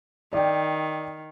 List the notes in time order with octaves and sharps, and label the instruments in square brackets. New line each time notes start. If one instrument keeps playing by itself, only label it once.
[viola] D#3 [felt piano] D5 G5